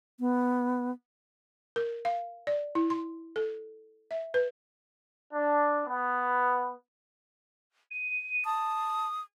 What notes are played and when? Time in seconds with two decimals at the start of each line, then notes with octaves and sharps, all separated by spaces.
0.20 B3
1.76 A#4
2.05 F5
2.47 D5
2.75 E4
2.90 C6
3.36 A4
4.11 E5
4.34 B4
5.34 D4
5.87 B3
7.91 D#7
8.45 A5 D#6